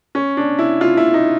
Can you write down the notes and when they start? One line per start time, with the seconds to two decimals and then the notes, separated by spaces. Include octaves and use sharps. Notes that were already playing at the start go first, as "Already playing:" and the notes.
0.15 C#4
0.37 D4
0.59 E4
0.81 F4
0.97 E4
1.14 D#4